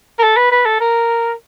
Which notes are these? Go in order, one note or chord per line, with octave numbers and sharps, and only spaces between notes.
A#4
A4
B4
B4
A4
A#4